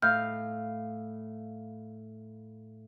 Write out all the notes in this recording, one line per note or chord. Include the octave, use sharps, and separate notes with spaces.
A2 F5 F6 G6